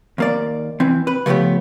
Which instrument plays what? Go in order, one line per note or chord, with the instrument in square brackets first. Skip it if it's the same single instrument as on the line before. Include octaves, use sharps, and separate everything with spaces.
[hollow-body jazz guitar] D#2 A#3 D5
E3 C4
B4
C#3 F3 A3 B3 G4